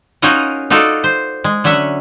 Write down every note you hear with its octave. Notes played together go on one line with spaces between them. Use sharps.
C#4 D#4 F4 F#4 A#4 D#5
D#4 F4 F#4 A4 D5 D#5
C5
G#3
D3 F#3 C#4 E5 F#5